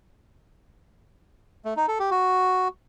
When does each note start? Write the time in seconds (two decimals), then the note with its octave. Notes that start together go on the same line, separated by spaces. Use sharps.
1.65 A3
1.77 D#4
1.88 A4
1.99 G4
2.11 F#4